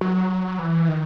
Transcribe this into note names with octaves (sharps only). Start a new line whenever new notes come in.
F#3
E3
D#3